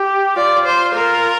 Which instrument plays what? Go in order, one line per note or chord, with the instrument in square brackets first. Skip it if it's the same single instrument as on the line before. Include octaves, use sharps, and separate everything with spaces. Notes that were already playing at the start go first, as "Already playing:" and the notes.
Already playing: [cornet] G4
[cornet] F4 [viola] D5
[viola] C5
A#4